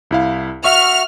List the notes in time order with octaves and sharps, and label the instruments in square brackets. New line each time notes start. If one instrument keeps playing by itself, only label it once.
[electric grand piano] C2 E4 F5
[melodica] F#4 F#5 [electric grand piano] E5 C#6 [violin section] F6